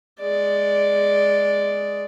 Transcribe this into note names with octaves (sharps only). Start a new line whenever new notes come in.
G#3 D5